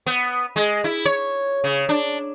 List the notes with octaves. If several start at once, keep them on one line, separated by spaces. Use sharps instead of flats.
B3
G#3
E4
C#5
C#3
D4